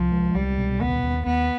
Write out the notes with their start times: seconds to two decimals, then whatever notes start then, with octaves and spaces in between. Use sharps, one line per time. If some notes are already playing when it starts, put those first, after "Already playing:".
Already playing: C2 F3
0.12 G#3
0.35 C2 G3
0.57 B2
0.80 D#2 B3
1.03 D#2
1.26 D#2 B3